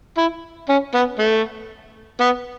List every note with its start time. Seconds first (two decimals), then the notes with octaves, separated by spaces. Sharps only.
0.18 E4
0.69 C#4
0.94 B3
1.18 A3
2.20 B3